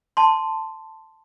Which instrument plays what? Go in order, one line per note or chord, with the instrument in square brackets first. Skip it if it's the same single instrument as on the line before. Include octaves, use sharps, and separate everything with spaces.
[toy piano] A5 C6